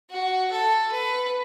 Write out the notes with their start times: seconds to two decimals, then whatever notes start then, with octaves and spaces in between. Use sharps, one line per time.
0.11 F#4
0.52 A4
0.92 B4